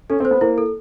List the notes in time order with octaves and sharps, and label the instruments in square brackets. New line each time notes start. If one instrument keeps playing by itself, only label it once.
[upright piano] C#4 [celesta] A4
[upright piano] C4
[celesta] C5
[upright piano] B3
[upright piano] A#3 [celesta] E4
[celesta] A4